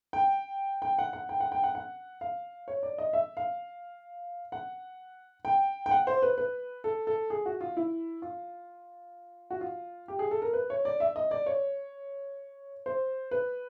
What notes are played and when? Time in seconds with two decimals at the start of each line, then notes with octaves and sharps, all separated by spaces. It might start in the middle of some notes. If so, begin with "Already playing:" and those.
0.13 G5
0.82 G5
0.98 F#5
1.13 F#5
1.29 G5
1.40 F#5
1.52 G5
1.63 F#5
1.75 F#5
2.21 F5
2.68 C#5
2.83 D5
2.98 D#5
3.13 E5
3.37 F5
4.52 F#5
5.45 G5
5.86 G5
5.91 F#5
6.07 C5
6.22 B4
6.38 B4
6.84 A4
7.07 A4
7.30 G#4
7.46 F#4
7.61 F4
7.77 E4
8.22 F4
9.50 F#4
9.61 F4
10.08 G4
10.19 G#4
10.31 A4
10.42 A#4
10.53 B4
10.70 C#5
10.85 D5
11.00 E5
11.16 D#5
11.31 D5
11.46 C#5
12.86 C5
13.31 B4